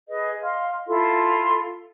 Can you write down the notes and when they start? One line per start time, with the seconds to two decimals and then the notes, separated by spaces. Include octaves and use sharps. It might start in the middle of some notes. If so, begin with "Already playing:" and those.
0.08 G#4 B4 D#5
0.42 D#5 F5 C6 F6
0.87 E4 F4 A4 C6